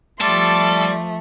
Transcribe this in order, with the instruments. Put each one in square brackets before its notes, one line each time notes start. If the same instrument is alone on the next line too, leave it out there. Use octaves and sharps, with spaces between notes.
[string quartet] F3 A3 [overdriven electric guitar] G3 [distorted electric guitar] A4 [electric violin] C6 D6